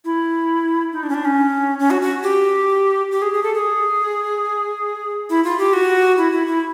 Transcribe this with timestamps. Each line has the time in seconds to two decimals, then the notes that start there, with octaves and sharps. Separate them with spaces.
0.05 E4
0.92 D#4
1.03 D4
1.10 C#4
1.14 D4
1.25 C#4
1.79 C#4
1.90 F#4
2.02 F#4
2.23 G4
3.11 G4
3.22 G#4
3.33 G#4
3.43 A4
3.54 G#4
5.30 E4
5.44 F4
5.59 G4
5.73 F#4
6.18 E4
6.32 E4
6.47 E4